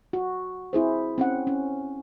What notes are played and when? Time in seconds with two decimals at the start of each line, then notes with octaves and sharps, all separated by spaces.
0.13 F#4
0.73 C4 E4 G#4 C5
1.18 C4 C#4 F#5
1.47 C#4